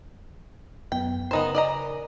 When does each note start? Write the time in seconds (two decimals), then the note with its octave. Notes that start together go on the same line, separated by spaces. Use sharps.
0.92 F#2 F#3 B3 G5
1.31 C#3 B3 D#4 A#4 C5 G#5
1.55 D5 D#5 A#5